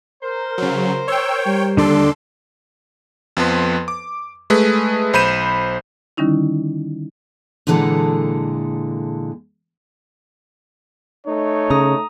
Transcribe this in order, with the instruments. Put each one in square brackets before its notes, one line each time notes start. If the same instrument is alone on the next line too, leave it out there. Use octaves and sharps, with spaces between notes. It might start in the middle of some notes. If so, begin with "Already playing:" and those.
[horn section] A#4 C5
[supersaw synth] C#3 F#3
[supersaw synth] C#5 G5 [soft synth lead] E6
[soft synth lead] G3
[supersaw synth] D#2 A4 C6 [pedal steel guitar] D3 D4 D5
[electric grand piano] F2 F3 B3 B4 C6
D6
G#3 A3 G#4 B4
B1 C5 B5 G6 D#7 E7
[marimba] D3 D#3 G3 C#4 D#4 E4
[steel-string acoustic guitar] A#2 D3 E3 G#3 A4 F#5
[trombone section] A3 D#4 [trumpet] C#5
[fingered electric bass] C#3 [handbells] A#5 D#6